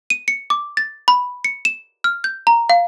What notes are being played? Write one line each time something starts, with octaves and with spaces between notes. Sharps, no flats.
D#7
C#7
D6
A6
B5
C#7
E7
F6
G6
A#5
F5